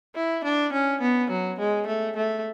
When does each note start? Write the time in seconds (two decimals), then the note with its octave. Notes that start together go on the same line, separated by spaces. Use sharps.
0.15 E4
0.44 D4
0.72 C#4
1.01 B3
1.30 F#3
1.59 G#3
1.87 A3
2.16 A3